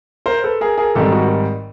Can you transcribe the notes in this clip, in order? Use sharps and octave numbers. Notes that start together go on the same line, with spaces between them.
A#4 C5
A4 B4
G#4 A#4
G#4 A#4
G#1 G#2 D#3 G3 G4 A4
F#4